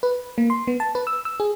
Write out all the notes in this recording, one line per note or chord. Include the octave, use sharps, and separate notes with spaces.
B4
A#3
C6
B3
A5
B4
E6
E6
G#4